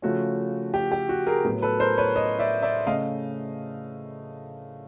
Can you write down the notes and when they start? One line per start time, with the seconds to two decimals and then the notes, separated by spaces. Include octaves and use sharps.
0.02 C#3 F3 A3 C#4 F#4
0.74 G4
0.92 G4
1.09 F#4
1.27 G#4 A#4
1.45 A2 F#3 B3
1.62 A4 B4
1.80 A#4 C5
1.98 B4 C#5
2.16 C#5 D#5
2.39 D5 E5
2.62 D5 E5
2.86 C#3 A3 D#5 F5